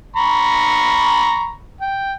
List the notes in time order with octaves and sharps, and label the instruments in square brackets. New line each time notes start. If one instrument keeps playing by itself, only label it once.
[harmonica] A#5 B5 C#6
G5